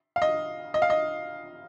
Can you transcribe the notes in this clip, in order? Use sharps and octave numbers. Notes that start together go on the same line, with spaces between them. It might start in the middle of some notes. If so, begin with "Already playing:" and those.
F5
D#5
D#5
F5
D#5